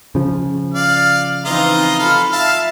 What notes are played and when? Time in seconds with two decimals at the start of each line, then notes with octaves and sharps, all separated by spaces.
0.15 C#3 F3
0.74 D5 F5
1.45 E3 C4 D#4 F4 D#5 A#5
1.99 F4 A4 F5 B5
2.32 E5 F5 A5